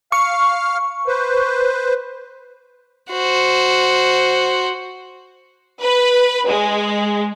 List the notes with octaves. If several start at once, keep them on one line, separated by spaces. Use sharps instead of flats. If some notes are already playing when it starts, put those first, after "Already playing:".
F5 C#6 F6
B4 C5
F#4 C5
B4
G#3